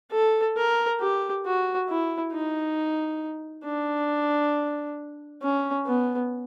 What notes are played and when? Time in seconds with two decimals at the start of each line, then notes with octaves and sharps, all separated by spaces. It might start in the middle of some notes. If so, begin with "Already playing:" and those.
0.12 A4
0.57 A#4
1.00 G4
1.45 F#4
1.88 E4
2.33 D#4
3.65 D4
5.42 C#4
5.86 B3